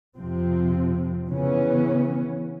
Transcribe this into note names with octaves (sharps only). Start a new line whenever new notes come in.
F2 C3 F3 C4
C#3 E3 B3 C#4